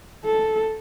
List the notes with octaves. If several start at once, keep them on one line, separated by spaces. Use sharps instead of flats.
A4